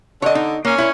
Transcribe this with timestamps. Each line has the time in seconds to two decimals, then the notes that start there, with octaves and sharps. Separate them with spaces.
0.22 D3 C#5 D#5
0.35 D#4
0.65 A#2 A#3 C#4
0.78 E4 C#5